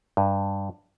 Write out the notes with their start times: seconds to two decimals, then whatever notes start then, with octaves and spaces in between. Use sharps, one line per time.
0.17 G2